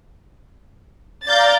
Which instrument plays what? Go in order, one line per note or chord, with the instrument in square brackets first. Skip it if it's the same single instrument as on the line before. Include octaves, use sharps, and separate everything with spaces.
[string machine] D5 F5 A#5 [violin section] G6 A6